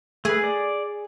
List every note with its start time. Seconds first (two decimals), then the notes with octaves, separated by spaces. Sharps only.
0.25 A3 G#4 B4
0.44 D5